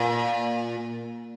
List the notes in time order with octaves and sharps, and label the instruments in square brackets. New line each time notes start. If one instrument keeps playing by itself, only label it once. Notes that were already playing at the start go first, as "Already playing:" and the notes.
Already playing: [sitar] A#2